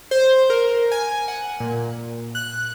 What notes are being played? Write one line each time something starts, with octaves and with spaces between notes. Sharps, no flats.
C5
A#4
G#5
F#5
A#2
F#6